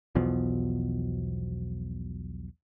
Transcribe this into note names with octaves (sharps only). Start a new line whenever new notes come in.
B1 E2 B2 F3